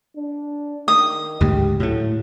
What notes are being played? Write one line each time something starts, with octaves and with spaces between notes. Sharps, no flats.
D4
D#3 D#6
D2 G#2 C#3 G4
A2 F#3 A3